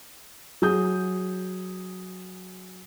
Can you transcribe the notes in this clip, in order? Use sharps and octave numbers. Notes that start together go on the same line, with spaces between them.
F#3 G#4 D#6 G6